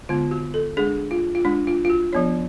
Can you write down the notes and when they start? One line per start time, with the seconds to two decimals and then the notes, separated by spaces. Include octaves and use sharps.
0.09 D3 G#3 B3 F4
0.31 F#4
0.54 A4
0.77 G#3 D4 G#4
1.11 F4
1.35 F4
1.45 G#3 D4
1.67 F4
1.85 F4
1.90 F#4
2.13 F3 B3 D4 C#5